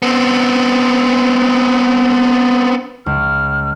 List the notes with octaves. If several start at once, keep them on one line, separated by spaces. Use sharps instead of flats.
B3 C4
C#2 F6